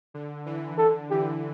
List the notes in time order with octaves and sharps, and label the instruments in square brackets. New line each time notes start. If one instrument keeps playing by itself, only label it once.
[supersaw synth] D3
E3
[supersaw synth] D3 [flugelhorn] A4
[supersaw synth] E3 [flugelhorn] G4